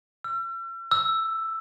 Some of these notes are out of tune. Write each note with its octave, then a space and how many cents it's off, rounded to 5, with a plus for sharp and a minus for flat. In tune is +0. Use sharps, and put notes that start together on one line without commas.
E6 +45
E6 +5